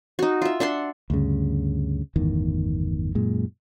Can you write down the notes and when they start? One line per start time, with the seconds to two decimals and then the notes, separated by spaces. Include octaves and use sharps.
0.19 D#4 F#4
0.42 F4 E5
0.60 D4 E5 F#5 C6
1.10 D2 G2 C#3
2.16 G1 E2 A2 D#3
3.15 F#2 A#2 G#3